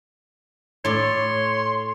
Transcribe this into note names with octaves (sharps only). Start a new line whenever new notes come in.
A2 C#5 D5 C6